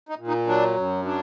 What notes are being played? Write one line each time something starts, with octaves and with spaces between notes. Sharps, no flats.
D#4
A#2
D#4
F#3 D4
F#2
F#3 D4